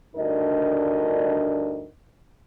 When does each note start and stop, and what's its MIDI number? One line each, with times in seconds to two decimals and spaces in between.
0.16 1.87 38
0.16 1.87 43
0.16 1.87 62
0.16 1.87 63
0.16 1.87 70
0.16 1.87 75